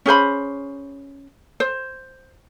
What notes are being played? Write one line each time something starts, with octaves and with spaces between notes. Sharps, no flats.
C#4 G#4 C5 B5
C5